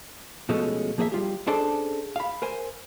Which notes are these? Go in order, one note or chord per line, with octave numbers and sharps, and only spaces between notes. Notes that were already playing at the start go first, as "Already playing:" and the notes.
B2 F3 G#3 A3 C#4
F3 A#3 G#4 D#5 E5
G3 F4 G4
C#4 D4 G#4 A4 C5 D5
F5 B5
A#4 C5 G#5